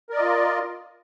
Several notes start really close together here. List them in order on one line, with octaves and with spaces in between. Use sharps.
A#4 D5 D#5 F4